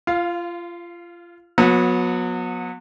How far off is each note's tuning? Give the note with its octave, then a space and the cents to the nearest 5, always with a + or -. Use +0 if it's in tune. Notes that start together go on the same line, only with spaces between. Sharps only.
F4 -25 F5 +0
F#3 -35 B3 -15